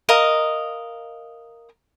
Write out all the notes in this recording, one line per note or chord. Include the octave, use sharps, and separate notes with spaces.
A#4 D#5 F5 A#5